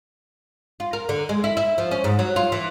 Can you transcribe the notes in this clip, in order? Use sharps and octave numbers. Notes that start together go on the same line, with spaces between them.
F4
A#4
D3
G#3
E4
E4
F3
C#4
G#2
F#3
F4
E3